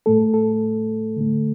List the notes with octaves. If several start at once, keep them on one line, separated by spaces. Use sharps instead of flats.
A2 A3 A4
A4
D3 A3